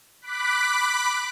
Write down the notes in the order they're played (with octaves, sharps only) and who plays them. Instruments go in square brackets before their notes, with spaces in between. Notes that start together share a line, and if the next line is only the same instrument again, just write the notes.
[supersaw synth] B5 D6 F#6 B6